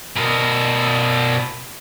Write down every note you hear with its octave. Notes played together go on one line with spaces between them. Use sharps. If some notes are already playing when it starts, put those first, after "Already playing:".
B2 A#4